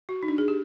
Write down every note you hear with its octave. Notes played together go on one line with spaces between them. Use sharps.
F#4
D#4
D4
G#4
G4